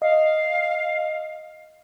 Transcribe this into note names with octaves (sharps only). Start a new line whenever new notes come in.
D#5 F5